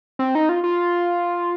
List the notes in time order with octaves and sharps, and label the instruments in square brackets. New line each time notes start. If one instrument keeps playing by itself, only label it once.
[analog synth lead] C4
D#4
F4
F4